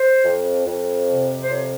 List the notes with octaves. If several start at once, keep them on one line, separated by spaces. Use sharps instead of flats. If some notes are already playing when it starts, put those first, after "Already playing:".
Already playing: C5
F2
F2
C3
C5
F2 C#5